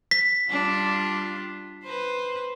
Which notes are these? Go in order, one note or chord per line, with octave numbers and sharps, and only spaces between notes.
B6
G3 D4 F4
B4 C5